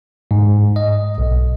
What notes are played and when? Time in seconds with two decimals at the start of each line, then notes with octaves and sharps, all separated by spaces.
0.31 G#2
0.76 D#5
1.18 B1